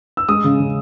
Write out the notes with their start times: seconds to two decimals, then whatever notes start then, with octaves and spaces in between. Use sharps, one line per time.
0.17 E6
0.28 G#3 D#6
0.44 C#3
0.60 C#3